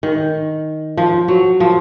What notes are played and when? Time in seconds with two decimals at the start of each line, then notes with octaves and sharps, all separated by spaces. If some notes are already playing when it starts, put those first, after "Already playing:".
0.03 D#3
0.97 F3
1.28 F#3
1.60 F3